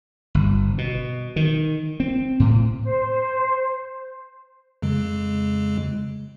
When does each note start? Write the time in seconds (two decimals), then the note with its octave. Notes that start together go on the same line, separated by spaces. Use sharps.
0.35 G1
0.78 B2
1.36 D#3
2.00 C4
2.40 A2
2.83 C5
4.82 F2 C#3 G#3